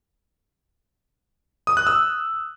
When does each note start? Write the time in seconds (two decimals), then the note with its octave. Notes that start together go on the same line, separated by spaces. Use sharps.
1.67 D#6
1.77 F#6
1.87 E6